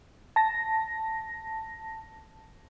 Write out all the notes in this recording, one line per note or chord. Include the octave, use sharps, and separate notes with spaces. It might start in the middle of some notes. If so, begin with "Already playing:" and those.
A5 A#6